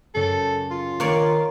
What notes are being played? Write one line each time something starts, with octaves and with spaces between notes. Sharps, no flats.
F#2 C#3 A4
F4
D#3 A#3 C#5 D5